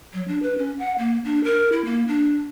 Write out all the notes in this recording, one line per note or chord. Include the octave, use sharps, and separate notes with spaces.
F#3
D4
B4
C#4
F#5
A#3
D4
A#4
E4
A#3
D4